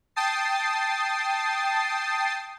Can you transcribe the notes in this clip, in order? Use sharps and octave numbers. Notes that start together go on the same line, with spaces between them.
G5 A5 D#6 A6 C7